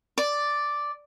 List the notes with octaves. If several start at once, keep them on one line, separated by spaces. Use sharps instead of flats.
D5